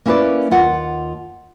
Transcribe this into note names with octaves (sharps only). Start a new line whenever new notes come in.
A#3 C#4 E4 A#4 B4 D5
D#2 F4 F#5